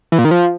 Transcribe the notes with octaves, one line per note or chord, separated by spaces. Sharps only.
E3
A#2
D#3
F3